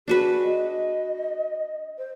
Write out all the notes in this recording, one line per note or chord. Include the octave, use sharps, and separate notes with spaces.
D4 F#4 G#4 B4
D#5
C5